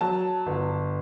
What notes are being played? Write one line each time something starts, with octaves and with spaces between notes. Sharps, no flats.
F#3 A5
G1